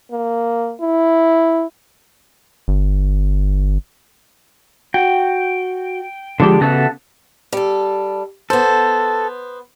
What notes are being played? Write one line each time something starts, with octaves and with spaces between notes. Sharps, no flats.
A#3
E4
G1
F#4 G5
D3 F3 G#3 D4 G4
C#3 B3 F#4 A4 E5 A5
G3 A4
B3 A4 C5